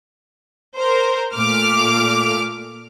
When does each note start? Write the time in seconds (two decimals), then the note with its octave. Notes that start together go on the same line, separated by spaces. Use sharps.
0.77 A#4 C5
1.35 A#2 A3 D6 F6